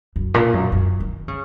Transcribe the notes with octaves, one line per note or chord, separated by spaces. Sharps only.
F#2
A#2
F#2
F#2
D#3
C#3